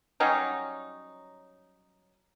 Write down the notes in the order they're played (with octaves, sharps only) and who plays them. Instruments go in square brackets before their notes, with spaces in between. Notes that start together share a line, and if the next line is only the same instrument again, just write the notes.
[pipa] F#3 G3 C#4 D#4